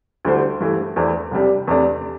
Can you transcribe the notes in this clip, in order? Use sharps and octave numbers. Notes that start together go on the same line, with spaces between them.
D2 D3 G3 E4 C5
G2 E3 A3
E2 E3 A3 D4 C5
C2 C3 G3 D4
E2 C3 A3 D4